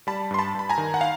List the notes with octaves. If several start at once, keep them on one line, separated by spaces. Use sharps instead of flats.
G3 A5 B5
G2 C6
A5 B5
G2 B5
G#5 A#5
D#3
F#5
F5